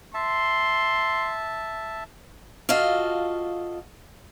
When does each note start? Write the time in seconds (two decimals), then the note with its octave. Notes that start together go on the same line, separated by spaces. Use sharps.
0.14 E5 A5 C6
2.69 F4 F#4 A4 D#5 F5